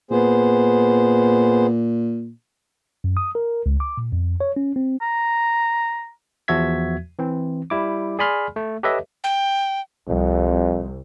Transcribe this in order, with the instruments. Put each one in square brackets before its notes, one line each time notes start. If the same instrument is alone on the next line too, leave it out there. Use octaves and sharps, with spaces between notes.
[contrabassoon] A#2 [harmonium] B3 G#4 C5
[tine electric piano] F#2
D#6
A#4
C#2
D6
A#2
F2
C#5
C#4
C4
[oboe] A#5
[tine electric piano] E2 F3 F#4 E5 G#6 B6
E3 C4
G3 E4 D6
G#4 D5 G#5 B5 C6 F6
A3
G4 A4 B4 C#5 D#5 E5
[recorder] G5
[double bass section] C2 [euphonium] F2